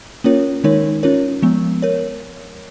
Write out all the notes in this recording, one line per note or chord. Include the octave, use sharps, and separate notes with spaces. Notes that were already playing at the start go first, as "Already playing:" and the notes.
A#3 C#4 F4 A#4 C#5
D#3 G#3 D#4 A#4 C#5
C#4 F4 A#4 C#5
F3 G#3 B3
A#4 C#5